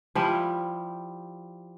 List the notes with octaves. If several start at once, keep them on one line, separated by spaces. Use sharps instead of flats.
F3 G3 E4